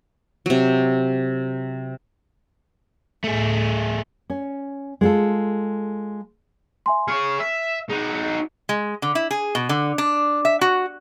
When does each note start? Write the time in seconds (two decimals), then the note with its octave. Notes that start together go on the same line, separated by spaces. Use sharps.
0.46 C3 F#3
3.24 D2 A2 A3 G#4
4.30 C#4
5.01 G#3 F4 A4
6.86 E5 G#5 C6
7.08 G#4 C#5 F6 C#7
7.40 E5
7.89 D#4 F#4 G#4
8.69 G#3
9.02 D3
9.15 E4
9.31 G#4
9.55 B2
9.69 D3
9.98 D4
10.45 E5
10.61 F#4